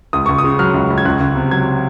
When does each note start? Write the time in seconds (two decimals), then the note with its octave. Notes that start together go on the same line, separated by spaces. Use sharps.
0.13 C#2 D#6
0.26 C#2 C#6
0.38 D#6
0.44 C#3
0.59 F#3 F6
0.74 C#2
0.90 C#2
0.98 G#6
1.05 C#2 F#6
1.21 C#2
1.36 C3
1.51 F#3 G#6